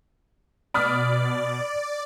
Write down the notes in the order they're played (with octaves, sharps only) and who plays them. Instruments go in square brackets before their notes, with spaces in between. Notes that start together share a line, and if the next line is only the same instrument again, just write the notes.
[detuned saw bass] B2 [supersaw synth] D5 [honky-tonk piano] B5 D#6 F6